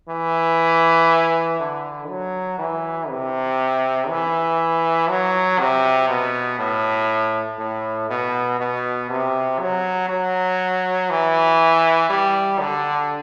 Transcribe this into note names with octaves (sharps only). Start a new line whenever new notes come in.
E3
D3
F#3
E3
C3
E3
F#3
C3
B2
A2
A2
B2
B2
C3
F#3
F#3
E3
G3
D3